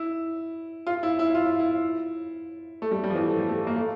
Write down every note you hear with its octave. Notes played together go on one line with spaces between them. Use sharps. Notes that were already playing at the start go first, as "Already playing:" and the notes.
Already playing: E4
F4
E4
E4
F4
E4
A3
G3
G3
F3
E3
A3
G3
A3
A#3
A3